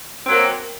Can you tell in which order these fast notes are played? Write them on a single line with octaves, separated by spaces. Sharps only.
C4 F#3 A#3